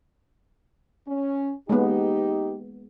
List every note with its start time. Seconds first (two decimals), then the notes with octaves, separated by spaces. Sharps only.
1.08 C#4
1.69 G#3 A#3 B3 D#4 G4